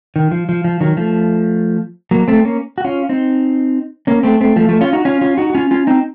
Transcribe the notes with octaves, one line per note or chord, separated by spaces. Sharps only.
D#3
F3
F3
F3
D#3 F#3
F3 A3
F#3 A#3
A3 C4
A#3 C#4
F#4
C#4 F4
C4 D#4
A#3 C#4
A3 C4
A3 C4
F3 A3
F3 A3
C#4 F4
D#4 F#4
C#4 F4
C#4 F4
D#4 F#4
F#4
C#4 F4
C#4 F4
C4 D#4